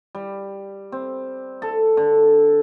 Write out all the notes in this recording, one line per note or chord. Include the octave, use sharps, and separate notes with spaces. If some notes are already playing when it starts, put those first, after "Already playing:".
G3
C4
A4
D3